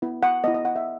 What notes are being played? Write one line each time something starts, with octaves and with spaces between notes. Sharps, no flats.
B3 E4
F#5
B3 E4 D#5
D#5
F#5
E5